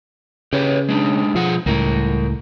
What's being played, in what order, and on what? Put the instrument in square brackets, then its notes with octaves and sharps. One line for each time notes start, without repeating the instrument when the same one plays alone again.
[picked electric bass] C#3 [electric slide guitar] G4 B4 C#5
[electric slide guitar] G#3 D4 D#4
[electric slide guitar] B2 G#4 F#5 [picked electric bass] F3
[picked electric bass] C#2 A2 [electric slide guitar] G3 A#4